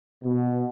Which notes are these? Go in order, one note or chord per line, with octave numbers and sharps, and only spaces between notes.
B2